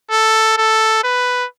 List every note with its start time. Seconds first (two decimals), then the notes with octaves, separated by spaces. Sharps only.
0.11 A4
0.57 A4
1.03 B4